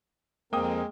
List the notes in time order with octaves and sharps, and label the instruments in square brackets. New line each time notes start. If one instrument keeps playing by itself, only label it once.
[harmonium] F2 C4 A#4 [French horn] G#3 [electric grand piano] A#3 D#6 [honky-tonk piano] G5